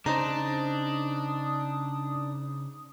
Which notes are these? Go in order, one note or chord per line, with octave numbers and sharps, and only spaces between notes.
C#3 D4 D#4 C5 A#5 D#6